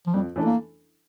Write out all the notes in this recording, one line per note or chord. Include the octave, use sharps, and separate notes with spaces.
F3
F2 G3
E3 A3 D4 A4
A#3